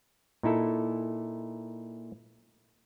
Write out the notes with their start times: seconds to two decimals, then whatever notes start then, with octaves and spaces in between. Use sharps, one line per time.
0.43 A#2 D#4 E4 A4